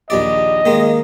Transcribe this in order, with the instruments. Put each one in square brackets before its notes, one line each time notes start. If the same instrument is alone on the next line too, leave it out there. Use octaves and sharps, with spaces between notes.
[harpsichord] A#1 D#2 D5 [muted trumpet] D#5
[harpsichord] D#3 G#3 [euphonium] A#3